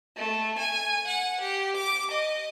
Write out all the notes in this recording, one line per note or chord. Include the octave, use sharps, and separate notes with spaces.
A3
G#5
F#5
G4
D6
D#5